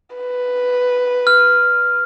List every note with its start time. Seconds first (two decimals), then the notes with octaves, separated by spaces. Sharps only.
0.16 B4
1.27 F6